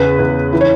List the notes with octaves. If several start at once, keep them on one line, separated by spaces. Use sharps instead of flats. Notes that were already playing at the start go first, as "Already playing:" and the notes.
Already playing: E2 C#3 B4
E2
E3
C#5